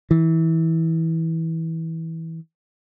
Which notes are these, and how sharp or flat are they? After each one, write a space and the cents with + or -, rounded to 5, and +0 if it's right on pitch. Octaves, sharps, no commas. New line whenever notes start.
E3 -20